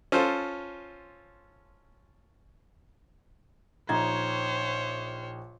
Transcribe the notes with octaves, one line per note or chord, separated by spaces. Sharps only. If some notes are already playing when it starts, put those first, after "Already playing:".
C#4 F4 A4 C5
A#1 D#4 C5 C#5 D#5 G#6